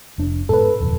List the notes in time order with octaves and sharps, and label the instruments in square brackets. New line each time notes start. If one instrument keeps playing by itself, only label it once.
[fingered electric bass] F1 D4
[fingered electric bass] G#2 B2 [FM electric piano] A4 B4
[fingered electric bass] D#1 F2 C#3